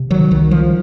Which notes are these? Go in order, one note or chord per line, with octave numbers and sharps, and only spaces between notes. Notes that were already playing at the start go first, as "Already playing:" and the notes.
Already playing: C3
D#3 F#3
C2 D#3
F3